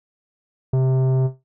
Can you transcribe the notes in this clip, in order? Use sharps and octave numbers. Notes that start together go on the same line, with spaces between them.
C3